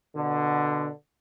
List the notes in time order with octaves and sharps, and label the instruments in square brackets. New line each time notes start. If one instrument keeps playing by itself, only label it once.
[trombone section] B2 D3